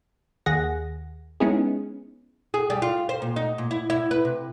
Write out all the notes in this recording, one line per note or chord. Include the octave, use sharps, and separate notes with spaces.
D#2 G#4 F#5 A#6
G#3 B3 C#4 D#4 E4 G#4
G#4
G3
F4
C5
A#2
D#4
A#2
E4
E4
B4
C3